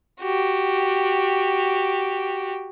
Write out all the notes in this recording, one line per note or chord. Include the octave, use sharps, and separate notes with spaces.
F#4 G4